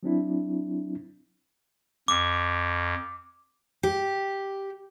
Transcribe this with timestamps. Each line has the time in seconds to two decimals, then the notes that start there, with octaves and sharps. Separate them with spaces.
0.03 F#3 C4 D4 E4
2.08 F2 D6
3.83 G4